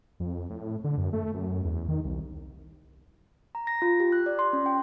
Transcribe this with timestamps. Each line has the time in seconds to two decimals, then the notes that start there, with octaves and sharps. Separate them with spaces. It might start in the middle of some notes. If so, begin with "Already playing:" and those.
0.20 F2
0.50 A2
0.84 D3
0.98 F#2
1.13 A3
1.34 F#2
1.65 E2
1.88 D#3
2.05 C2
3.55 A#5
3.67 A#6
3.82 F4
4.00 G4
4.12 F#6
4.26 D5
4.39 C6
4.53 C#4
4.66 G5